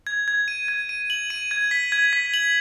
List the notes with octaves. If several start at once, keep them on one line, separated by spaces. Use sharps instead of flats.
G#6
G#6
D#7
G#6
D#7
F#7
D#7
G#6
B6
G#6
B6
F#7